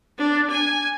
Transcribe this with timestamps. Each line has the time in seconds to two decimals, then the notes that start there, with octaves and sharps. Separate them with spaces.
0.18 D4
0.50 G#5